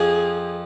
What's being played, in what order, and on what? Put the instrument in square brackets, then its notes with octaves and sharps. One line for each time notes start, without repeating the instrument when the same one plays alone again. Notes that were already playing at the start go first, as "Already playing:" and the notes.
Already playing: [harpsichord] F2 F3 [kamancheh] G#4